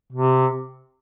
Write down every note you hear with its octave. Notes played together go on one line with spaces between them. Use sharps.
C3